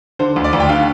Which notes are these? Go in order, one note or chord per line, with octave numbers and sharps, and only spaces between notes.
D3 C5
D2
D5
D2
G5
D3 F5